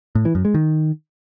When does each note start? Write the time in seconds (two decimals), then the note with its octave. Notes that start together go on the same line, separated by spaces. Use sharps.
0.15 A2
0.25 E3
0.35 F#2
0.45 G#3
0.54 D#3